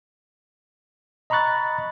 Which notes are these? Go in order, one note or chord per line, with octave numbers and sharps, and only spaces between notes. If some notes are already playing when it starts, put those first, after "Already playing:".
D#5 A#5 B5 C#6 F#6 A6